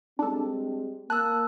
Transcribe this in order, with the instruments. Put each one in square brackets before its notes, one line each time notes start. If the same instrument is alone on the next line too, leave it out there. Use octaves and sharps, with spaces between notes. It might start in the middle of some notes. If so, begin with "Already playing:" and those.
[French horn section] G3 G#3 C4 [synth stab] D4 A4
[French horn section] A#3 [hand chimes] A5 E6 [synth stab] F#6